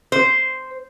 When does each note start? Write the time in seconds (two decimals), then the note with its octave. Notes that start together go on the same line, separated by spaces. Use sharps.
0.12 C5